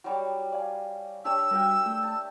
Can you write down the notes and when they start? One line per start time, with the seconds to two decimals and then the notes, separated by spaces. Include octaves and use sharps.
0.04 F#3 G3 D6
0.52 D5 F5 G#5
1.25 D4 G4 C#5 E6
1.51 G3 F#4 A#4 E5 G5
1.86 A3
2.03 A5